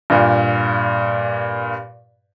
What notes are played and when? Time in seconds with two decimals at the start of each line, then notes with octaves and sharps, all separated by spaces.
0.10 G2 A#2